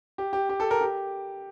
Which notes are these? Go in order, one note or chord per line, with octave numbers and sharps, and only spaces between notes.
G4
G4
G4
A4
A#4
G4